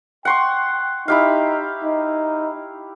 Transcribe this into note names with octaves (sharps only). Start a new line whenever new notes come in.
F#5 G5 C6 C#6
D#4 E4 G4 F5
D#4